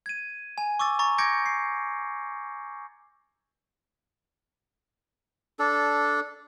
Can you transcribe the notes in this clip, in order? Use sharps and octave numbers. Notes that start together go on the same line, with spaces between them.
G#6 D#7
G#5
C#6 D6 E6 A6
A#5 C#6 A6
D6 G6 G#6 A#6 C#7 D7
C7
D4 A4